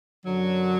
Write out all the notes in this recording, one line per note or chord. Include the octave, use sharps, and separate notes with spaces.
F#2 D3 F#3